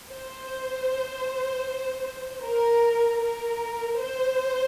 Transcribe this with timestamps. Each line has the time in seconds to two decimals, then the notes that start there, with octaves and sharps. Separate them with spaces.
0.11 C5
2.44 A#4
3.22 A#4
4.00 C5